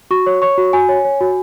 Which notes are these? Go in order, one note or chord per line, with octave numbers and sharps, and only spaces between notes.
F#4 C#6
C#5
C#5 C#6
F#4
F#4 G#5
C#5
C#5
F#4